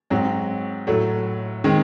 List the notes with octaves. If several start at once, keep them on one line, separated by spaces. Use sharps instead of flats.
G#2 F#3 C4 F#4
A2 F#3 A3
D#3 G#3 C4